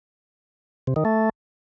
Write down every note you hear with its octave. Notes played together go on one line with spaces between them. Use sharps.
C3
D#3
A3